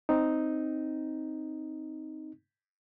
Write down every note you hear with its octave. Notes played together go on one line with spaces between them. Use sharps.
C4 D#4